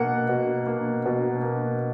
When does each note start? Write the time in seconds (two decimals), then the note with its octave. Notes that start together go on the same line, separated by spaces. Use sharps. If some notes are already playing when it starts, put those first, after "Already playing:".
Already playing: B2 A#3 F#5
0.29 B2
0.67 A#3
1.06 B2
1.43 A#3